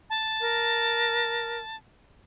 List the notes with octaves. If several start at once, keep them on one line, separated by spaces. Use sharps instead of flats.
A5
A#4